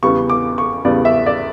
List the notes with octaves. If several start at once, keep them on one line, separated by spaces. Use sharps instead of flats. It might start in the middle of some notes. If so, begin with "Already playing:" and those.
E2 C#3 G3 B3 C#6
D6
C#6
E2 C#3 G3 B3 D5
E5
D5